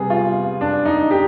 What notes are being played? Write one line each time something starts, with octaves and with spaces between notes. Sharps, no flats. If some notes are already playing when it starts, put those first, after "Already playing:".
Already playing: C3 G3 B3 G#4
F4
D4
D#4
G4